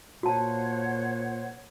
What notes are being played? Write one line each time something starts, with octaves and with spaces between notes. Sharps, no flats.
A#2 F#4 C5 C#5 F#5 A5